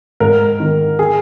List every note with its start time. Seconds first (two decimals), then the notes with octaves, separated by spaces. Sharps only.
0.20 G#2 A#4
0.60 D#3
0.99 G#4